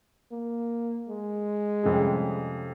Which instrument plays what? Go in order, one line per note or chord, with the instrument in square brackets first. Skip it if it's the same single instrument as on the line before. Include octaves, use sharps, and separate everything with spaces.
[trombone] A#3
G#3
[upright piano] F2 C3 G3 C#4 G#4